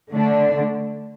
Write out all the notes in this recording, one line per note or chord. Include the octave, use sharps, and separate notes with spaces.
D3 A3 D4